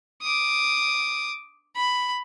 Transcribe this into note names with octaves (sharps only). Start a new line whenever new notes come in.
D6 D#6
B5